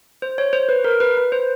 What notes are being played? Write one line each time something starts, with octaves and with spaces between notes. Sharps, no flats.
C5
C#5
C5
B4
A#4
B4
B4
C5